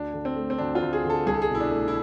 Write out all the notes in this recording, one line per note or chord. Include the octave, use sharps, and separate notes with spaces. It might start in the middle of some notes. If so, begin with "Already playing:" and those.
Already playing: D2 D4
D3
C4
A3
C4
D2 D4
F4
D2
G#4
D3
A4
C2 G#4
A4
G#4
B2
E4
D4
A3
E4